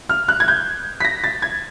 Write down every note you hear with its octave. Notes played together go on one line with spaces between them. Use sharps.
F6
F#6
G#6
G6
B6
A#6
A6
G#6